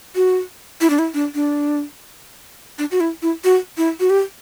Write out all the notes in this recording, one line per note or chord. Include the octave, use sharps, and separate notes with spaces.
F#4
E4
D4
E4
D4
D4
D4
F#4
E4
E4
F#4
E4
F#4
G4